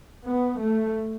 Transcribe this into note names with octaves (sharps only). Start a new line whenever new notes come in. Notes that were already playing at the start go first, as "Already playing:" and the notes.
B3
A3